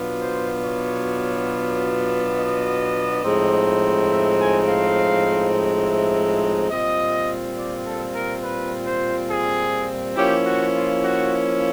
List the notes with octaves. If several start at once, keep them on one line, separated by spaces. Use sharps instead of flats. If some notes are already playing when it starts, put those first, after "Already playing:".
Already playing: B2 F#3 B3 D4 F4
C5
C#5
D#5
A2 F3 G#3 C4 D#4
E5
G#5
F5
E5
A#2 G3 C4 F4 D#5
D5
A4
A#4
B4
C5
G#4
F3 A#3 C#4 E4 G4
F#4
F4
F#4